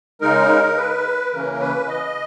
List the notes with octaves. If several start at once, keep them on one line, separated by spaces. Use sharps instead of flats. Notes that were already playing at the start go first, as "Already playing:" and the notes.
C#3 G#3 D#4 A#4
B4
C#3 E3 A#3 C#4 A#4
B4
D#5